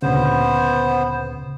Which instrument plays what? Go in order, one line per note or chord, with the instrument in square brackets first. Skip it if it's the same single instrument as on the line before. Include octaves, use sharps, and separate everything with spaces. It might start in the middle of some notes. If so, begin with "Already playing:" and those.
[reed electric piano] D2 A#2 C#3 [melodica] B3 C5